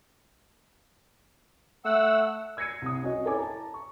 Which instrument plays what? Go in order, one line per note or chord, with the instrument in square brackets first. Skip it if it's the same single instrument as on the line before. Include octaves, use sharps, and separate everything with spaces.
[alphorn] A3 [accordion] F#5 E6
[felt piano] E6 G#6 A#6 C7 C#7 D#7
C2 D#6
C#4 F#4 D#5
E4 A4 C#5 G#5 D6
A5 A#5
C#6